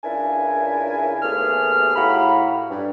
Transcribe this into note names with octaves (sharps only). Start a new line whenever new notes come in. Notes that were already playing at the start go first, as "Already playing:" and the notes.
C#2 C#3 D4 E4 A#4 G#5
D#2 A3 B3 G#4 F6
A2 F#4 G4 F5 A#5 B5
G2